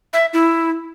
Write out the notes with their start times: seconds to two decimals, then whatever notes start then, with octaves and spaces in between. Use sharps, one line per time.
0.13 E5
0.33 E4